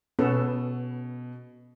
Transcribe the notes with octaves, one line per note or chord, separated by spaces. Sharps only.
B2 B3 C#4 A4